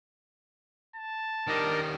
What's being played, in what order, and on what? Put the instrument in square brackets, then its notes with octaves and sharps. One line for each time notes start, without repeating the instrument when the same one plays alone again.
[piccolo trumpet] A5
[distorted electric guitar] D#3 G3 [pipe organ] D4 A#4 D#5